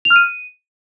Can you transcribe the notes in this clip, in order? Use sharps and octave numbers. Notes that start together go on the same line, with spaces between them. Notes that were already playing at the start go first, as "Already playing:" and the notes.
F7
F6
D#7